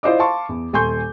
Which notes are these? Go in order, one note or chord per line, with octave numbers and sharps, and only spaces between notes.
E4 F4 C5 D5 D#5 D6
F5 A5 C6 C#6
E2
D#1 A4 G#5 C6 C#6 G6